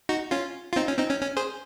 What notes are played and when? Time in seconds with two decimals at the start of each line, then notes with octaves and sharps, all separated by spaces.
0.09 D#4 F#4
0.31 C#4 F4
0.73 F4
0.76 C4 D#4
0.88 C#4
0.98 C4 D#4
1.10 C#4
1.22 C#4
1.37 G#4 C5